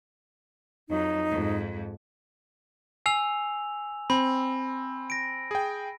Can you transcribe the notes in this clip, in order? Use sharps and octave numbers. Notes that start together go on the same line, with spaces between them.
F2 F#3 D#4
F2 G#2
G#5 E6 C7 F7
C4 B5
A#6 D7
G#4 G5